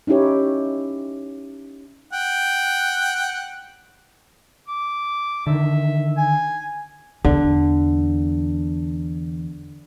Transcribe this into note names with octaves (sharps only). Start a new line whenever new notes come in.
C#4 D#4 E4 G4 C#5
F#5 G5
D6
D3 D#3 E5
G#5
E2 D3